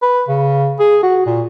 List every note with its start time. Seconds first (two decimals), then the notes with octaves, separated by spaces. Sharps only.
0.02 B4
0.29 C#3
0.80 G#4
1.03 F#4
1.26 A#2